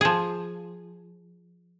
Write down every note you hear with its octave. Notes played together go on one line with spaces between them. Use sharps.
F3 G#4